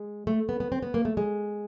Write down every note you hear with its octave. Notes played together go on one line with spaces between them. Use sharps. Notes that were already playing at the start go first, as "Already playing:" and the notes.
Already playing: G#3
A3
B3
B3
C4
B3
A#3
A3
G#3